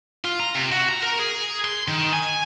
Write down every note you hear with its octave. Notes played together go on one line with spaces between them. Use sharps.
F4
A#5
C3
F#4
A#5
A#4
G#4
C6
D#3
G#5